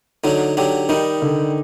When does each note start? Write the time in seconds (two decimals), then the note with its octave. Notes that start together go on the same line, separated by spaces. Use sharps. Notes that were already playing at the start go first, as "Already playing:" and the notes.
0.24 D3 F#3 D#4
0.57 D3 F#3 G4
0.89 D#3 G3 D#4
1.22 D3